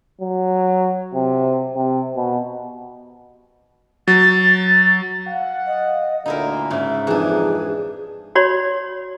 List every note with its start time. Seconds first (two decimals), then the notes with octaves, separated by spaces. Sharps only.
0.21 F#3
1.14 C3
1.75 C3
2.16 B2
4.08 F#3 A6
5.27 F5 F#5
5.67 D#5
6.26 D2 A#2 D3 D#4 E4 A#4
6.70 G#2 C#3 E5
7.07 F2 E3 D4 D#4 G#4
8.35 F#4 C#5 D5 B5